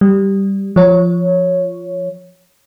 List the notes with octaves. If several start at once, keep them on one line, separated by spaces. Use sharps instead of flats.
G3
F3 C#5